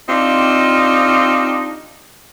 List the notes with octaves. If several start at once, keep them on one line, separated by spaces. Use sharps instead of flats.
C4 D4 D#4 F4 G4